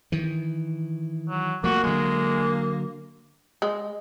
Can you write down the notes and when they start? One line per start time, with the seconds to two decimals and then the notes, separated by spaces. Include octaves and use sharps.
0.12 D#3 E3
1.29 F#3
1.64 F3 F#3 A3 A#3 F#4
1.84 D3 F#3 G#3
3.62 G#3